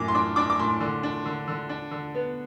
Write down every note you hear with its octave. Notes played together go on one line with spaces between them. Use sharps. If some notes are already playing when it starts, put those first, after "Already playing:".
Already playing: F#2 A2 D6
C6
D4 D6
D4 D6
D6
A2 C6
D3
D4
D3
D3
D4
D3
B3